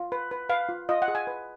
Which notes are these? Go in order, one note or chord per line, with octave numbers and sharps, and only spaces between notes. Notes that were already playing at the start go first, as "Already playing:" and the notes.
Already playing: F4
B4
B4
B4 F5
F4
F4 D#5
F#5
G#4
G#5
B4